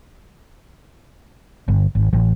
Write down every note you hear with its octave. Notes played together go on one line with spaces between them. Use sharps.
G1
G#1
A1